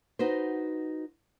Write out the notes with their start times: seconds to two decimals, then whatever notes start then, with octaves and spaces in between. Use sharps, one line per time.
0.19 D#4 F#4 B4 C5